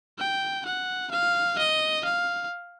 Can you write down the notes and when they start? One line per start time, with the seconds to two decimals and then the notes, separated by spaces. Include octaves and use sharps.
0.18 G5
0.65 F#5
1.11 F5
1.58 D#5
2.05 F5